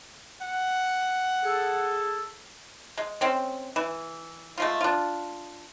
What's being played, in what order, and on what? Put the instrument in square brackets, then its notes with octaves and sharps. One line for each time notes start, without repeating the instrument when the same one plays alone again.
[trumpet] F#5
[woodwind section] G#4 A4
[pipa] G#3
G#3 C4 C#4
E3
G#3 A3 F4
D4 F4